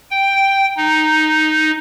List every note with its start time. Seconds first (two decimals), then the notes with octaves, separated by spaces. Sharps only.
0.11 G5
0.76 D#4